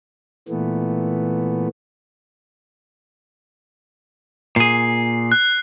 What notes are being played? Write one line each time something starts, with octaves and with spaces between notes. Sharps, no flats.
A#2 E3 A3 B3
A#2 G#4 C7
F#6